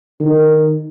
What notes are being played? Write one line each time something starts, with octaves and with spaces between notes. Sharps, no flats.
D#3